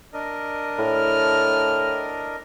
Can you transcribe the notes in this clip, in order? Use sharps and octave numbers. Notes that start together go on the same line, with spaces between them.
D4 A#4 D#5
A2 F6